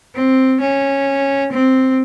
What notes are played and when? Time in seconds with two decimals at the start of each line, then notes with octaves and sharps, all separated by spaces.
0.15 C4
0.61 C#4
1.52 C4